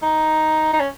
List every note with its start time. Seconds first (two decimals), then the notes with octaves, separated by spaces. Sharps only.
0.02 D#4
0.73 D#4
0.80 C#4